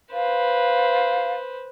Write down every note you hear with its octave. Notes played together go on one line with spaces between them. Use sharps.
B4 C5 F5